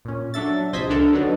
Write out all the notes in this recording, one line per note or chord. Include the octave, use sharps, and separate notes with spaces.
A#2 C#4
F#3 D4 A4 E5 A6
A#1 C3 C5 D#5 G#6 B6
C#2 D3 D4 A4 A#4
D3 F#3 B3 D4 D#4